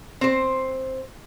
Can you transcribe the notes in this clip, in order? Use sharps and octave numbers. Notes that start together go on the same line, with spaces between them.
C4 C5